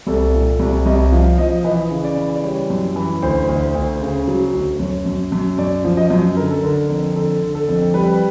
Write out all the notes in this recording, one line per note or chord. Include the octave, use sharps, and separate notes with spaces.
C2 A4
A#2
C2
C2 D#5
F3 F5
F3 D#5
E3 D#5
C#3
D5
E3
D5
G3 C#5
F#2
E3
D2 C5
D2
D2
C#3
F#3
D2
F#2 C#5
F#2
F#2
F#2 D5
F3
D#5
F#2
D3 A#4
A4
D3 A#4
F2
D3 A4
D3
A4
F2
G3 B4